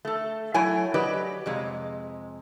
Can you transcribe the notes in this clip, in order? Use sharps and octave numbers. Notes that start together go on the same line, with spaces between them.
A3 A4
F#3 A3 E4 C#5 G#5
F#3 G4 B4 D5 D#5
F2 C3 G#3